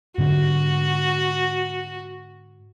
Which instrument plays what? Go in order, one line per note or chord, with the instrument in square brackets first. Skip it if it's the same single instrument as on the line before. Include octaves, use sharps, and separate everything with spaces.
[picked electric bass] G#2 D3 [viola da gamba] F#4